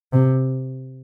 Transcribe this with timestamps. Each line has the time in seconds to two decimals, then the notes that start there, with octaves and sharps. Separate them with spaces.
0.13 C3